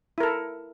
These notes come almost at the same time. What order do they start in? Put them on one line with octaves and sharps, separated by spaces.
E4 A#4 A4